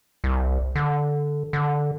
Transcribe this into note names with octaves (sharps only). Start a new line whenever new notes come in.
C2
D3
D3